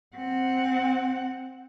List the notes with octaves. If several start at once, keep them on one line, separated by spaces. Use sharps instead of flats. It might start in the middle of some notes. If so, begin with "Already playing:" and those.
C4 F#5